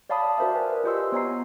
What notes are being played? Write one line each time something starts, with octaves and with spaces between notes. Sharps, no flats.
C#5 D5 F5 A5 B5 D#6
F#4 A#4 C5 D5 E5
B4 G#5
F4 G4 C5 D#5 C6 E6
B3 C#5 G#5 A#5 C7